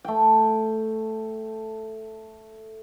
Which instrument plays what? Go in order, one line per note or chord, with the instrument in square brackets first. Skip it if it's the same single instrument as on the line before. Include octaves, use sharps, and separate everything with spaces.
[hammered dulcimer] A3 G5